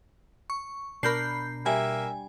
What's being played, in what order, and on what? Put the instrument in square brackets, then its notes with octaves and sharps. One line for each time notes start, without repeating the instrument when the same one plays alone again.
[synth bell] C#6
[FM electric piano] B2 [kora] D4 A#4 [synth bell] B5 G6 C7
[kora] G3 [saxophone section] A#3 E5 [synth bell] G#5